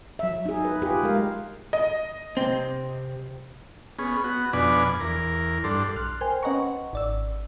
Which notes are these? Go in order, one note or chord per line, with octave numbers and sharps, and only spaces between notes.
F#3 E5
D#4 G#4
B4
F4 G4 G#4 B4
G#3 A#4 F5
D#5
C3 C4
B3 C#4 G#4
B3 F#4
F2 B2 D4 B4 D5 G#5
E2 A#4
G2 D4 A4 C6
B1 F6 F#6
A#4 C5 G5 G#5 C6
C#4 B4 D#5 F#5 A#5 C#6
G#1 D5 E6